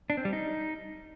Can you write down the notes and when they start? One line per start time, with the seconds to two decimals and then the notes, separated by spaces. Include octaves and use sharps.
0.10 D4
0.17 C4
0.25 G3
0.33 D#4